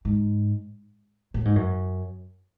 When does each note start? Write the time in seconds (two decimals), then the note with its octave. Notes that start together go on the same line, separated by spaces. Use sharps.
0.05 G#2
1.34 A2
1.45 G#2
1.56 F#2